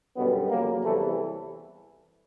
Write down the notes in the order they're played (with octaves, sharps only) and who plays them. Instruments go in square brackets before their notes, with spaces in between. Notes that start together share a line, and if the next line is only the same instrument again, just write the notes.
[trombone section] F#2 B2 D3 G3 B3
F2 C#3 F#3 A#3
E2 C3 E3 G3 A3